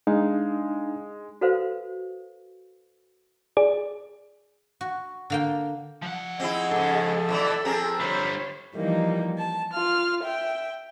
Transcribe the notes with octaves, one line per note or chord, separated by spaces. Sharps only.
G#3 D4 D#4 F5
F#4 A4 B4 C5 F5
G#4 D5
F#4
D3 A#3 G5
F3 F#5
C4 E4 G#4 D#5
G#2 C#3 A4
B2 E3 G3 D5 E5
F3 C4 G#4 A#4
D3 G3 C5 C#5 B5
E3 F3 G3 A#3 D#4
A5
F4 F6
E5 G5